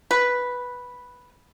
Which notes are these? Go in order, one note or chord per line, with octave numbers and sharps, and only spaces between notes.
B4